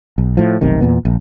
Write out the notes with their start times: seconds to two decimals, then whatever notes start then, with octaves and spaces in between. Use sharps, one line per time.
0.18 B1
0.37 A2 F3
0.61 F1 B1 C3 D#3
0.81 E2 A#2 B3
1.05 A#1